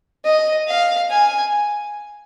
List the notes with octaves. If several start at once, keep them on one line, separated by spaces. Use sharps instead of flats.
D#5
F5
G#5